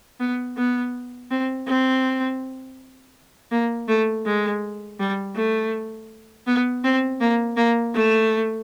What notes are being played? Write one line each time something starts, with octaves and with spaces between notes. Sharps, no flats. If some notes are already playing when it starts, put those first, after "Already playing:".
B3
B3
C4
C4
A#3
A3
G#3
G3
A3
B3
C4
A#3
A#3
A3